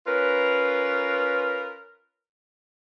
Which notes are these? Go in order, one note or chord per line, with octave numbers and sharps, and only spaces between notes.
C#4 F4 A#4 B4